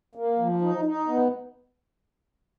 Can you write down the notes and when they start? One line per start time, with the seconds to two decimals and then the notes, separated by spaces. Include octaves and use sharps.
0.15 A#3
0.39 F3
0.62 D#4
0.85 D#4
1.08 B3